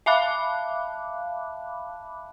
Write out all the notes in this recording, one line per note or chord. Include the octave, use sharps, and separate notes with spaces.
E5 F5 A5 B5 D6 F#6